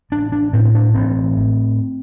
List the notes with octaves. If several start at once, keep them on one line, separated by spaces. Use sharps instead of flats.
A1 D4
D4
A2 C4
C4
D4
A1 C4
A2